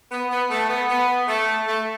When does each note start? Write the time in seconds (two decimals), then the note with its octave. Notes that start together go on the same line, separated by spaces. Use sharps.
0.12 B3
0.31 B3
0.51 A3
0.70 B3
0.89 B3
1.28 A3
1.68 A3